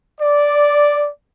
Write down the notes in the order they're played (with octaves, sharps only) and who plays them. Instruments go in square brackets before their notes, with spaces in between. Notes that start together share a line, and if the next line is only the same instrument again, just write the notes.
[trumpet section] D5